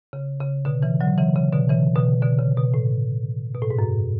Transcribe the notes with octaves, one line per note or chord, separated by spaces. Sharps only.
C#3
C#3
B2 D3
C#3 E3
D3 F#3
C#3 E3
C#3
B2 D3
C#3 E3
B2 D3
B2 D3
C#3
B2
A2
B2
A2
G#2
F#2